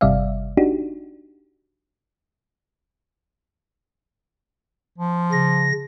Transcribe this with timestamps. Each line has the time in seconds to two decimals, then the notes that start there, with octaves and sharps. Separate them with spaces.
0.01 G1 C3 G3 D5 E5 F5
0.57 D4 D#4 F#4 G4
4.98 F3
5.32 C#3 A#6